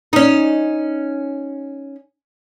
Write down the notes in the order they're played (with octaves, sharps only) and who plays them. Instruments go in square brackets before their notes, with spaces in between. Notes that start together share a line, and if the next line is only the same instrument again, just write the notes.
[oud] C#4 D#4